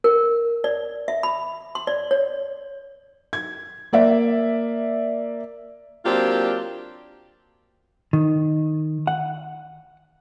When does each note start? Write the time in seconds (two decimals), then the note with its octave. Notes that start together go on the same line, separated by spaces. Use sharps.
0.04 A#4
0.64 D5
1.08 E5
1.23 B5
1.75 C6
1.87 D5
2.11 C#5
3.33 G#6
3.93 A#3 D5 E5
6.05 F#3 A#3 C4 D4 F4 G4
8.13 D#3
9.07 F#5